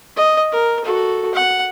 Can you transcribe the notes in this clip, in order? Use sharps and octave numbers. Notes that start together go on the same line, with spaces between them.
D#5
A#4
F#4 A4
F#5